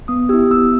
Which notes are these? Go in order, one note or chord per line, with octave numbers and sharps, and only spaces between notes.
B3 D#6
E4 G4 E6
B3 E6